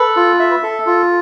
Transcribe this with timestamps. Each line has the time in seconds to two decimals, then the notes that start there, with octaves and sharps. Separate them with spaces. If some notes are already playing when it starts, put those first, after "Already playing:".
Already playing: A4 B4
0.17 F4
0.39 E5
0.63 A4
0.86 F4